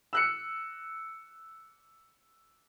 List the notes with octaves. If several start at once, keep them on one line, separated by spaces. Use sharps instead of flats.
E6 F#6 C#7